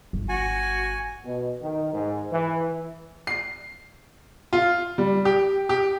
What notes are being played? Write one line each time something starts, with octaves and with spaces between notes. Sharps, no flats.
G1
F#4 G#5
B2
D#3
G#2
E3
C7
F4
G3
G4
G4